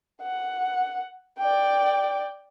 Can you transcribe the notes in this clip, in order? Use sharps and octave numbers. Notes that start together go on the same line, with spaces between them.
F#5
D5 G5